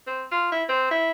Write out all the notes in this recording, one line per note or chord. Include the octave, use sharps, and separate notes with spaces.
C4
F4
E4
C4
E4